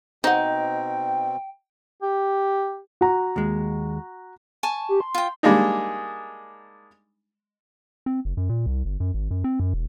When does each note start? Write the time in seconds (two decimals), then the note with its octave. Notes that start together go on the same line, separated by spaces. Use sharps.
0.24 B2 C4 D#4 C5 F#5 G5
2.02 G4
3.01 F#4 A#5
3.36 D#2 G#3
4.63 G#5 A5 C#6
4.89 G4
5.00 C6
5.15 F4 G5
5.43 G3 G#3 A#3 D4 D#4
8.06 C4
8.25 F#1
8.37 F#2
8.49 A#2
8.66 C2
8.85 G1
9.00 F#2
9.14 G#1
9.31 F#2
9.44 C4
9.60 F#2
9.73 E1